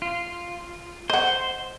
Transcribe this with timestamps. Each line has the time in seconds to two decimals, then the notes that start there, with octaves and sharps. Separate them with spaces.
0.02 F4
1.10 C5 D#5 F#5